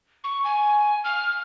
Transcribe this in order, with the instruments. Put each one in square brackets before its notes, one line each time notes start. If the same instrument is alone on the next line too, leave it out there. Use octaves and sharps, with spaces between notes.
[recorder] C#6
G#5
F6